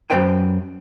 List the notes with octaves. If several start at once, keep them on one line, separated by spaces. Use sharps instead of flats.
F#2 G3 B4 C5 G5 G#5